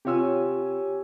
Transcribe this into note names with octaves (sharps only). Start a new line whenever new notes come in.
C3 F4 G4 C#5 G#5 E6